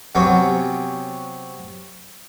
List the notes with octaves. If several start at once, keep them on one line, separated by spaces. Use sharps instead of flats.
C3 F#3 B3 C#4